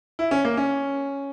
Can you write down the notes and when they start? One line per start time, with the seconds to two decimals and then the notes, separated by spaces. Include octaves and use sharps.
0.19 E4
0.31 C#4
0.45 A#3
0.57 C#4